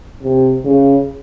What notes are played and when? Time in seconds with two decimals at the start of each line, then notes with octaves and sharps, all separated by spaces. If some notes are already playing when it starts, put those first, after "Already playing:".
0.23 C3
0.65 C#3